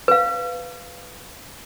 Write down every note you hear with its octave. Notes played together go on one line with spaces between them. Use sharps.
B4 F5